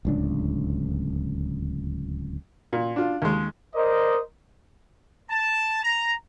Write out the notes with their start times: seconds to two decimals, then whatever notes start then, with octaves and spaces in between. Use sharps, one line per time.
0.05 D1 C#2 D4
2.73 A#2
2.96 D4 F4
3.22 D#2 G#3
3.75 A#4 C5 D5 D#5
5.31 A5
5.83 A#5